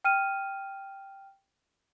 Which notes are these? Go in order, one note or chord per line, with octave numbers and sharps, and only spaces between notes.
G5 F6 D#7